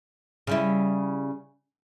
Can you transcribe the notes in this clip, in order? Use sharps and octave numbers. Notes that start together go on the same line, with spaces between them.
C#3 G3 E4